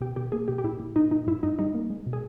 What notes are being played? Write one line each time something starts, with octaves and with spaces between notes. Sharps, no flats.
B2 G4
B2 G4
A#3 G#4
B2 G4
G4
A#2 E4
A#2
A#2 D#4
A#2 D#4
G2 E4
G2 D#4
G3 D#4
A#3
G#3
B2
G#4